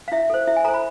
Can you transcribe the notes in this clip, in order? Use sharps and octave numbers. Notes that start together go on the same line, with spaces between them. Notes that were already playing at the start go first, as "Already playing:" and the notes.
F5
E4 E5
A4 C5
E4 E5
G#5
A4 C5 A#5
B5